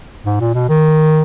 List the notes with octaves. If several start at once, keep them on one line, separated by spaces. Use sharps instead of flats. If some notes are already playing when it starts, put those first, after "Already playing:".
G#2
A#2
B2
D#3